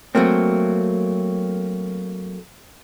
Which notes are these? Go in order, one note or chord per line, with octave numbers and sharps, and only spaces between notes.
F#3 A3 A#3 C4